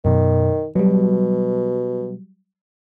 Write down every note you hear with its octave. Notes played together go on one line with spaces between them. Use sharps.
F#2 B2 D#3
B2 F#3 G3